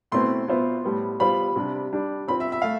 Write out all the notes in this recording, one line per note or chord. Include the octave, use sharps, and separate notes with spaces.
B2 A3 C4 E4 B4 C6
B2 B3 F4 C5 E5
A2 G3 B3
G3 B3 F4 C5 F5 B5
C3 G3 D4
G3 D4 G4 D5
C4 F4 C5 B5
E5
E5
A3 F5